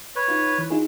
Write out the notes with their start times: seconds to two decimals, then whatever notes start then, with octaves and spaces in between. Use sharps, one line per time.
0.16 B4 C#5
0.28 D#4 F4
0.58 E3
0.70 D#4 F4 G#4